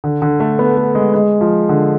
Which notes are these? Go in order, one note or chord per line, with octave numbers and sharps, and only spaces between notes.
D3
D3
A3
B3
A3
G#3
G#3
F3
D3